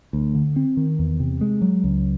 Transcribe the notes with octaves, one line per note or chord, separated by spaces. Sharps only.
D2
D3
C4
D#3
E2
C3
G#3
F#3
C#2